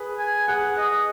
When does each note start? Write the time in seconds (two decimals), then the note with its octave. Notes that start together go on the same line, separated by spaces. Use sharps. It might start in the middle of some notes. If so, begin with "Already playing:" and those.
Already playing: G#4 B4
0.18 G#5
0.47 G#4 F#5
0.77 D#5